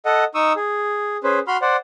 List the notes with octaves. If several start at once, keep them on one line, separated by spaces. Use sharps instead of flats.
A4 D#5 F#5
D#4 C#6 D#6 E6
G#4
C#4 G#4 B4 C5
F#4 B5 C6 F6
C5 D5 F#5